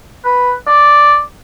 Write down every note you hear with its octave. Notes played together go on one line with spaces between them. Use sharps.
B4
D5